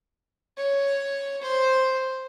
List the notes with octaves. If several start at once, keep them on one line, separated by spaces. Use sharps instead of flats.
C#5
C5